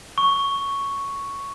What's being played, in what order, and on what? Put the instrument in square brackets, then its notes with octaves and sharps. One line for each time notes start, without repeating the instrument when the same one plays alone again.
[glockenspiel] C#6